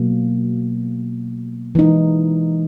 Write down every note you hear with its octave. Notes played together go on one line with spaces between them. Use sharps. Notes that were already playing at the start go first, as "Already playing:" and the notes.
Already playing: B2 F#3 A#3
E3 G#3 D#4